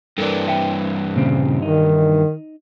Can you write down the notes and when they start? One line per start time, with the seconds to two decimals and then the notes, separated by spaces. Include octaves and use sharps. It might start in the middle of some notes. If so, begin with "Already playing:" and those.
0.18 G2 E3 A4 A#4 D5
0.48 E5 G5
1.16 A#2 C#3 C4
1.62 D#3 D#4